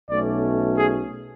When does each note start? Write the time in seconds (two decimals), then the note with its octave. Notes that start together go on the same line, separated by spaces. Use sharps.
0.10 B1 B2 A3 C#4 D5
0.78 G#4